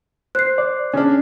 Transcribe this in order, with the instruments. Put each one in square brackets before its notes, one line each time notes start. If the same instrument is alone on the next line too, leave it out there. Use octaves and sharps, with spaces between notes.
[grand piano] C5 [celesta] F#6 C7
[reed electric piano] D5
[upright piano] C#3 D4 [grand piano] C#4